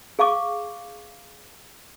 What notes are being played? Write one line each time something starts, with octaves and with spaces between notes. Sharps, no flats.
G#4 F5 C#6 D6